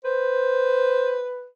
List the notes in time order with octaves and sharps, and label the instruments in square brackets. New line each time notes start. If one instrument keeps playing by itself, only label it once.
[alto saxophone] B4 [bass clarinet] C5